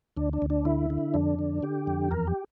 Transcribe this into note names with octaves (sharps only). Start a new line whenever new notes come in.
D2 D4
D4
D2
D4
D3 E4
D3
F2 D4
D3
D3 G4
F2
E2 A#4
G4